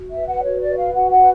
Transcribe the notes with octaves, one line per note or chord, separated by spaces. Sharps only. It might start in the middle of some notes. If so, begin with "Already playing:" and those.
Already playing: F#4
E5
B4
F#5
F#4 C#5
D5
B4
F5
F#4 F#5
F#5
B4